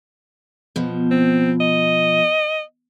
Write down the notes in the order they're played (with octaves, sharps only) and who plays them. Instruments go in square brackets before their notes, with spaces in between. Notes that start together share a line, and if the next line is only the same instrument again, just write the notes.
[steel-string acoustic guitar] B2 F3
[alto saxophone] C4
D#5